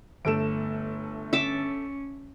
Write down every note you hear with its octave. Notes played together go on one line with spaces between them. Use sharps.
G1 A3 A4 D7 E7
C#4 E5 A5 D6